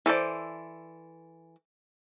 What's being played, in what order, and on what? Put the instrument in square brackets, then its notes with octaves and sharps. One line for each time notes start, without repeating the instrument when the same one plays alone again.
[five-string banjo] E3 A4 C5 D5